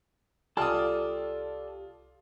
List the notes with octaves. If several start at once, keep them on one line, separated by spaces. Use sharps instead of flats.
C2 F4 G4 A4 D5 A5 D#6 F6